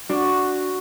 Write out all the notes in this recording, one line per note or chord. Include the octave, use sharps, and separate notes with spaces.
D4 F#4